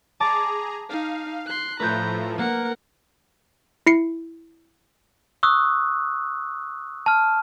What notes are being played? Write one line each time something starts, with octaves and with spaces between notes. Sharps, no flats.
G#4 A5 A#5 D6
D#4 F5
C6 F#6
A2 F3 A3 B4 A#5 G6
A#3 A#4 F#5
E4 C7 C#7
C#6 D#6 E6 F#6
A5 F6